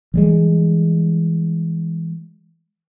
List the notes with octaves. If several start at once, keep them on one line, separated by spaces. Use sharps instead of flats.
E3 G3 G#3